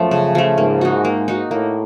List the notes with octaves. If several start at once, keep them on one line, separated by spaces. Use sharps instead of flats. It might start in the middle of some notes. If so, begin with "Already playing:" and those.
Already playing: F#2 F3 A3
C#3
F3 A3
G#2 A#3
D#4 F#4
A#3
D#4 F#4
A2 A#3